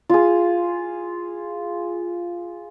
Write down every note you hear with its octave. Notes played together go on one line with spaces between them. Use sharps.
F4 G#4